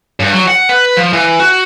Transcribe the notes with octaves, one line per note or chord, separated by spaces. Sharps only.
G2
F#3
F#5
B4
F3
E3
F#4